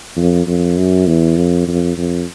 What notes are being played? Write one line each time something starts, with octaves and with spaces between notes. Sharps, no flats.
F2
F2
F#2
E2
F2
F2
F2